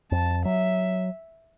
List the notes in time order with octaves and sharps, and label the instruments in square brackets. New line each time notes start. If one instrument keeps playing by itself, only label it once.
[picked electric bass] F2 [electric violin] A5
[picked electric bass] F#3 [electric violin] E5